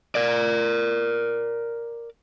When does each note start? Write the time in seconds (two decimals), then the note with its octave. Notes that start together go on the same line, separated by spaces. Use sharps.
0.15 A#4 D5